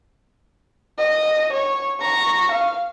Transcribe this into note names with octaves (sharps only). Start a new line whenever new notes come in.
D#5
C#5
A#5 C#6
F5